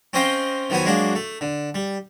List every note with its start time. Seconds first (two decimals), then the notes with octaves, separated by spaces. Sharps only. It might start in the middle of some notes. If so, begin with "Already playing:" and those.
0.13 C4 C#4 C5 D#5 F5 G5
0.70 D#3 F3 F#3 B3 G#5
0.86 F#3 G#3 A#3 D4 F#4
1.15 A3
1.41 D3
1.75 G3